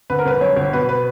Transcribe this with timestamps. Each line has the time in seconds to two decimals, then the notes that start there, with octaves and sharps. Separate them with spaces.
0.10 D3 B4
0.19 A#4
0.26 G1 B4
0.41 F#2 C#5
0.56 G1
0.73 B2 B4
0.89 B4